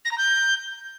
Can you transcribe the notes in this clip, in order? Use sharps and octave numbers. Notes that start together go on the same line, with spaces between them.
A#6
A#5
G6